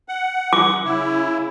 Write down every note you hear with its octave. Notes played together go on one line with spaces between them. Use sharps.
F#5
D6
C#3 E4